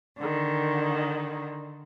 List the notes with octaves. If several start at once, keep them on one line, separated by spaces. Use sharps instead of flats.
D3 D#3